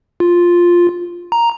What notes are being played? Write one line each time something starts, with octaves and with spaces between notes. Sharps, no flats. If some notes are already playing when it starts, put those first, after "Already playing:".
F4
A#5